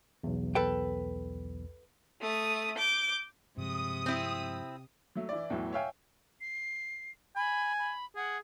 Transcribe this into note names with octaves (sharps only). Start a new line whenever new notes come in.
B1 E2
A4 B4 G5
A3 D#6
D6 G6
G2 C3 F3 G#3 D#6
C4 E4
F#3 A3
E3 E4 D5
E2 A2 E3 F#3
C#5 E5 F5 G5 G#5
C7
G#5 B5
B5
G#4 F#5